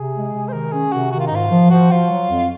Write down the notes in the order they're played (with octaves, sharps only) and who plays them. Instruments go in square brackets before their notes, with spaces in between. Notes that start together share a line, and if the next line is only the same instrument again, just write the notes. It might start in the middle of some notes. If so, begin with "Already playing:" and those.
Already playing: [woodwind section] C3 [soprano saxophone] G#4
[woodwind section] G#3
C3
[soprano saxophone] C5
[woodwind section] D#3 [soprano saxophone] A#4
[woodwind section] C#4 [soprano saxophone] G#4
[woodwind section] C3 [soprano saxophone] F#4
[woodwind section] D#3 [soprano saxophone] F#4
[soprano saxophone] F4
D#4
[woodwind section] G#2 [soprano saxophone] F4
[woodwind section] F3
[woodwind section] F3 [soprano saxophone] F#4
[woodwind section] F3 [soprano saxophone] F4
[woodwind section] F#3
F2